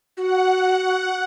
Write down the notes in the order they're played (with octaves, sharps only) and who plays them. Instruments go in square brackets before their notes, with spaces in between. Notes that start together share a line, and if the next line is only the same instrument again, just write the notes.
[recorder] F#4 [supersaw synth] F#5